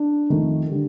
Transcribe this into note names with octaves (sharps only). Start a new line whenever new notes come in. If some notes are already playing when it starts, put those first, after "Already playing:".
Already playing: D4
F2 D#3 A3
D3 G3